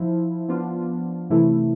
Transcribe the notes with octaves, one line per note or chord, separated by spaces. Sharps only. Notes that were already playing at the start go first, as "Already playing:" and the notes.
Already playing: F3 E4
F3 B3 D4 F4
C3 E3 A3 E4